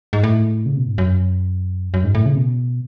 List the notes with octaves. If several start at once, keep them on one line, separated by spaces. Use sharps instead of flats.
G#2
A2
C#3
B2
G#2
F#2
F#2
G#2
A2
C#3
B2